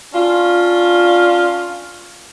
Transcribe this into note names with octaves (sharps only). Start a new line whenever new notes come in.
C#4 D4 F4